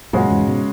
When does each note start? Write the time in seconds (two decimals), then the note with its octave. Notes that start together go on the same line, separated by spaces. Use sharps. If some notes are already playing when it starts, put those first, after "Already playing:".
0.13 F#2 A#2 C#3 G#3 C#4 F#4
0.30 E2 G#2
0.47 G#2 B2